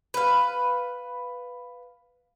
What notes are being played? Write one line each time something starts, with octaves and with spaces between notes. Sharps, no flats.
B4 F5